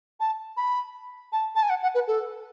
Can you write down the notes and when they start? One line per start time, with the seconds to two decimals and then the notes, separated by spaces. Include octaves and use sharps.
0.20 A5
0.57 B5
1.32 A5
1.55 A5
1.62 G#5
1.69 F#5
1.82 F#5
1.94 B4
2.07 A4